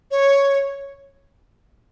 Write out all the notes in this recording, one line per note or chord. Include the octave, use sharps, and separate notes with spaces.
C#5